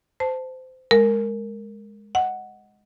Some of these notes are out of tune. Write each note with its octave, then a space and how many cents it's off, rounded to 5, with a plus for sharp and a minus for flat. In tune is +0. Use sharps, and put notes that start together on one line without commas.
C5 -20 A5 +0
G#3 +0 A#4 -10
D#5 +0 F#5 +0